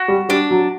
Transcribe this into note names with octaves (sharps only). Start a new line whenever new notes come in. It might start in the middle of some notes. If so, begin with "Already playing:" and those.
Already playing: F#4
G3
G3 D4
F#3